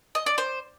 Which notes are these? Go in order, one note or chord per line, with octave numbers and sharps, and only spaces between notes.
D#5
D5
C5